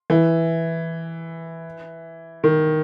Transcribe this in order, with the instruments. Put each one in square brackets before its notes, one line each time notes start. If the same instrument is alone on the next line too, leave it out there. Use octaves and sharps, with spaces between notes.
[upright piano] E3
D#3